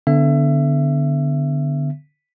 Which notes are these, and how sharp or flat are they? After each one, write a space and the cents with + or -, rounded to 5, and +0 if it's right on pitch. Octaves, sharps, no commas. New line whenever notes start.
D3 +0 B3 +25 E5 +25